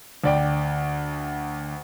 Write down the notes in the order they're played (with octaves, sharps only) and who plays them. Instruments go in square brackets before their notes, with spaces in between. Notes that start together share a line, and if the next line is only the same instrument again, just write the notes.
[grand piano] D2 D5 G5